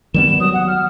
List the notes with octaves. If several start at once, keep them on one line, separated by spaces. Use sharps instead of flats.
D#3 G3 B3 E7
F#3 D#6
F#5
F6